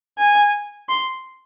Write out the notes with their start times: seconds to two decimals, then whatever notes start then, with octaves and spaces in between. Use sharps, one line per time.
0.18 G#5
0.89 C6